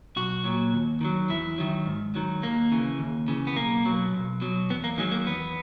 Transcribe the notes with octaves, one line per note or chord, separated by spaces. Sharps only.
B1 F#4
A#2 F#3
D#2
D#3 F#3
E2 E4
D#3 F#3
G#2
D#3 F#3
D#2 A#3
C#3 E3
D#2
C#3 E3
B3
B1 A#3
B2 F#3
B1
B2 F#3
E2 B3
A#3
D#3 F#3 G#3
A#3
E2 B3